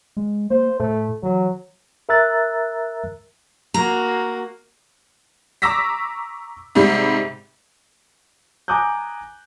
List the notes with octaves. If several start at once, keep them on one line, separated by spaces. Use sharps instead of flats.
G#3
A#3 C5
A2 A3
E3 F#3
A#4 E5 A#5 E6 F#6 A6
A#3 F#4 A#5
A#5 C#6 D6 E6 A#6 B6
G#2 C3 G3
G#5 A#5 D6 D#6 F#6 G6